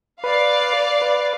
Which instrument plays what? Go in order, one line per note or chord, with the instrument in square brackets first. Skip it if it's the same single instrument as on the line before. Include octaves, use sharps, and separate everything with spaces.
[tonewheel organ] B4 [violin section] D5 F5
[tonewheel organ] B4